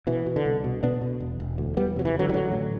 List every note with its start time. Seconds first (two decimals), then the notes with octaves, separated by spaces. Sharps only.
0.07 B2 E3
0.26 B2
0.36 D3
0.45 C2
0.64 B2
0.83 B2 B3 D4
1.01 B2
1.20 E1
1.40 E1
1.58 D2
1.77 E2 G3 B3
1.96 C3 F#3
2.05 E3
2.14 F#1
2.19 D3 F#3
2.29 G3
2.33 A1 D3 F#3
2.52 A2